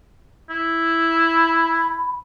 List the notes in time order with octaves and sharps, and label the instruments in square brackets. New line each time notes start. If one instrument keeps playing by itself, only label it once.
[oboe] E4
[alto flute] B5